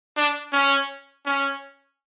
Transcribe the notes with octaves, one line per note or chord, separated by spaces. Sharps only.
D4
C#4
C#4